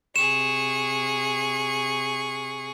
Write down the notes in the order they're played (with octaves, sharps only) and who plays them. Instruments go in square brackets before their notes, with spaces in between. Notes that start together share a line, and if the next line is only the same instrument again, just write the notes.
[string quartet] C3 G#4 C#6 [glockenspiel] E7